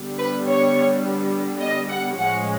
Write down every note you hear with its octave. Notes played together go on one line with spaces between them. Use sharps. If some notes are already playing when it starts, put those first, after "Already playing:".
Already playing: D3 G3 B3
B4
C#5
D#5
F#5
A2 F3 G#3 C#4 F#5